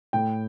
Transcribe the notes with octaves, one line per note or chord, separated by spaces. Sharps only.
A2 G5